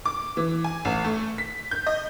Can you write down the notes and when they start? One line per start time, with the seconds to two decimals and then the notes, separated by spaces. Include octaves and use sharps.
0.05 D6
0.37 E3
0.64 G#5
0.85 A1
1.04 A3
1.38 B6
1.71 G6
1.87 D#5